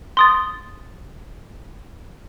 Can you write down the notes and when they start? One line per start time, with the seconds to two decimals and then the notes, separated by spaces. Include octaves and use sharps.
0.17 C6 D#6 A6